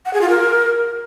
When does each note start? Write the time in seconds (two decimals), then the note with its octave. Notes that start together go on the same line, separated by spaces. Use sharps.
0.06 F#5
0.13 G#4
0.21 F4
0.29 A#4